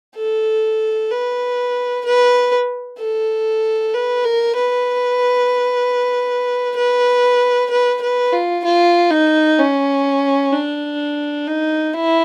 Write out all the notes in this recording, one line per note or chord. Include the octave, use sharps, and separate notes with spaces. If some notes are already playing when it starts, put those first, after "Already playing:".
A4
B4
B4
A4
B4
A#4
B4
B4
B4
B4
F4
F4
D#4
C#4
D4
D#4
E4